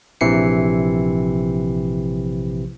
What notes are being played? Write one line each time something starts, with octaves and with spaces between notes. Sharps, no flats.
A#1 C3 E3 C7 C#7